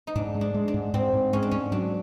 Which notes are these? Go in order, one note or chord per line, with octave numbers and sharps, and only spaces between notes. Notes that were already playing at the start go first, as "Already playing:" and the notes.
D#4
G#2 D4
G#3
D4
G#3
D4
G#2
G#2 C4
G#2
G#3 C#4
D4
G#2 C#4
F#3 D4